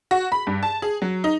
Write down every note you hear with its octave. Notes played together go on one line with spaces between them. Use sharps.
F#4
B5
G2
A5
G#4
F#3
D#4